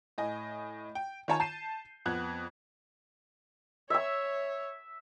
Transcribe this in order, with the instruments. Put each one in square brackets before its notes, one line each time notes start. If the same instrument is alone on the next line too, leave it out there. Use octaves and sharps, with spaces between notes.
[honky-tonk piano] A2 D#5 G#5
G5
D#3 F4 C#5 G#5 A5
A5 G6 C7 D#7 E7
F2 B3 F#6 G#6
[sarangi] C#5 [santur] E5 E6